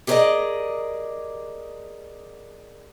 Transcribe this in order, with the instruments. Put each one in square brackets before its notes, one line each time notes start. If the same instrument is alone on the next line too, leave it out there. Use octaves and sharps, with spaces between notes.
[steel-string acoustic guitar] G4 G#4 A#4 B4 D5 D#5